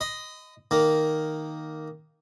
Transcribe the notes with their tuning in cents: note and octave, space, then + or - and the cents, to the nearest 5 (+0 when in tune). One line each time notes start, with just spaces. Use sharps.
D#5 +0 B5 +45
D#3 +0 A#3 +0